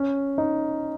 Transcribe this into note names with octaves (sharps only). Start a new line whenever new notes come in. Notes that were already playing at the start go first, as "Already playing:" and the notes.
Already playing: C#4
D#4